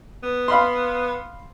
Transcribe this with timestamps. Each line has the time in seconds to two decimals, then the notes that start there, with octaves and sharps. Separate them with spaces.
0.23 B3
0.48 F5 B5 C6